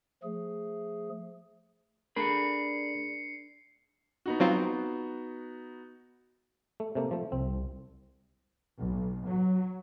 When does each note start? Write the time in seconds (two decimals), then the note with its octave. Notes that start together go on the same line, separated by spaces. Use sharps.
0.23 F3 A3 G#4
2.16 A3 D4 G#4 A#4 B5 C7 C#7
4.26 B3 D#4 F#4
4.40 F#3 C4 F4
6.80 A3
6.95 C3 A3 A#3
7.11 F3 A3
7.32 C2 C4
8.78 B1
9.26 F#3